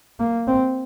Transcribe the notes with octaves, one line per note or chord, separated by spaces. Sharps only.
A#3
C4